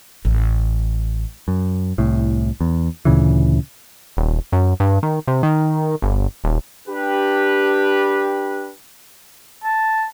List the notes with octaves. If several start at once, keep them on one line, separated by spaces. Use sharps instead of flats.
A1
F#2
C2 A2
E2
D2 A#2 C#3 E3
D#1
F#2
G2
D#3
C3
D#3
G1
D#1
D4 G4 B4
A5